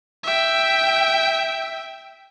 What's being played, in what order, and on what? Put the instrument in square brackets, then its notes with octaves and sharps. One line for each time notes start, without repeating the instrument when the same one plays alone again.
[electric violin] E5 G5